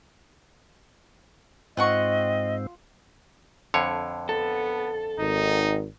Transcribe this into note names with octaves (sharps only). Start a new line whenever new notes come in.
G#2 C4 F4 D#5 F#5 C#6
F2 D3 C#5
B3 A4
G#1 D#4